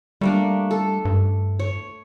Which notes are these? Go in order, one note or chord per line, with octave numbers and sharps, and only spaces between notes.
G3 A3 A#3 D4
A4
G2
C#5